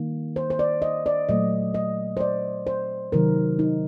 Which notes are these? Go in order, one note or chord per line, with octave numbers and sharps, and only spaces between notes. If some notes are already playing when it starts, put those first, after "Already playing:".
Already playing: D#3 G3 A#3
C5
C5
D5
D#5
D5
A#2 F#3 A3 D#5
D#5
C5
D5
C5
C3 D#3 F#3 A#4
D#4